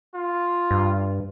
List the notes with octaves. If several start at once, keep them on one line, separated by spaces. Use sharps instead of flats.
F4
G2